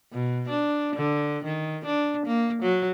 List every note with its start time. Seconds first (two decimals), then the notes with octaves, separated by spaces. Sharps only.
0.12 B2
0.49 D4
0.95 D3
1.44 D#3
1.85 D4
2.26 A#3
2.62 F#3